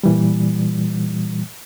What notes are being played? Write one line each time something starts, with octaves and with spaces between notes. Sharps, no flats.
A#2 E3 G3